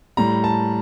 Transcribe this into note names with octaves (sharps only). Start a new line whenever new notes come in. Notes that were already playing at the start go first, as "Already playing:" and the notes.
A2 G3 A#5
A5